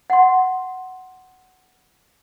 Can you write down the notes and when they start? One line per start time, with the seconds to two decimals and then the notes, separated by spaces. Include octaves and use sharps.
0.10 F#5 C6